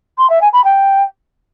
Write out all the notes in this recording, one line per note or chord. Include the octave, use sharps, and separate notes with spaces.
C6
E5
G#5
B5
G5